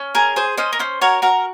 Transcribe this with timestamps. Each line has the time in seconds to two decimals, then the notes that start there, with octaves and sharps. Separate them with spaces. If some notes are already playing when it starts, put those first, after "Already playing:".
Already playing: C#4
0.15 G#4 A#4
0.36 G#4 C5
0.58 C#4 C5 D#5
0.73 A#4
0.79 C#4 C5
1.01 F#4 A#4 C#5
1.22 F#4 A#4